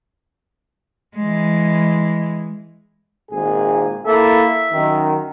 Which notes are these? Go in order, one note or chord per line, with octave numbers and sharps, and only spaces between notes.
E3 G#3
G#1 A#2 G#4
A#3 E4 A4 E5
F#2 D#3